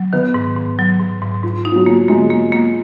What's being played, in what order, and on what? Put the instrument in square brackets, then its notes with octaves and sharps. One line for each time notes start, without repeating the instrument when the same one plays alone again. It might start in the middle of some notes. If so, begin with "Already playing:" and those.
Already playing: [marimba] F#3
[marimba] D#3 [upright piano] B3
[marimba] G#2
G#2
F#3
G#2
G#2
[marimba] G#2 [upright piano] F3
[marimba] D#4
[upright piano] F3
F#3
[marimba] A#3
[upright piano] G#3 [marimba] A#3
[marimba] A#3
A#3